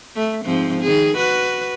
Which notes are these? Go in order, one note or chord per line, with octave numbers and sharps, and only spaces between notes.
A3
G#2 F3 C4
D#3 G#4
F#4 B4